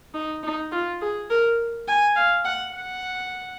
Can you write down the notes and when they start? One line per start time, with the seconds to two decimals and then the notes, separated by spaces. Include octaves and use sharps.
0.14 D#4
0.43 D#4
0.72 F4
1.01 G#4
1.30 A#4
1.88 G#5
2.16 F5
2.45 F#5
2.74 F#5